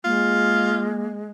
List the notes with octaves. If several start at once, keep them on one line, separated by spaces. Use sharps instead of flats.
G#3 A#3 F4